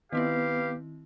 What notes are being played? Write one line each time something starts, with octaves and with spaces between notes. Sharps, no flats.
D#3 B3 C4 E4 G4 B4 F5